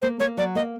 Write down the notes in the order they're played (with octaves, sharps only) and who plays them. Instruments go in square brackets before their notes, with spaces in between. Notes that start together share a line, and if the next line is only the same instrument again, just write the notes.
[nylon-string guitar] A#3 [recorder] C5
[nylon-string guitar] A#3 [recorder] C#5
[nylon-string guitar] F#3 [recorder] D5
[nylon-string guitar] A#3 [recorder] D#5